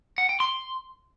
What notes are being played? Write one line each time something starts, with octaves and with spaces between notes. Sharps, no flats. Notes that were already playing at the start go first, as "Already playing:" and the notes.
F#5
G5
C6